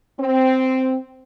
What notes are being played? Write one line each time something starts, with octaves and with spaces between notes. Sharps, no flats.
C4